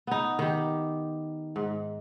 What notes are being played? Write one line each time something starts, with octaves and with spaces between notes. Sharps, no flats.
B3 D#4
D#3 G4
G#2